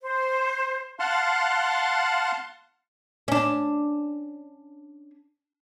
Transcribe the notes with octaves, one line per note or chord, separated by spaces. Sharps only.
C5
F5 F#5 A5 C6 F6 F#6
C#4 D4